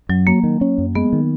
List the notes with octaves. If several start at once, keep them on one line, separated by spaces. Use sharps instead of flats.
F#2 F#3
F#3 A#3
D#3
C#4
F#2
G#3 B3
D#3